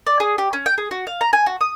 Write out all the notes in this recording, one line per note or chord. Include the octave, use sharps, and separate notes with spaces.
D5
G#4
G4
C#4
G5
G#4
F#4
F5
A#5
G#5
F#4
D#6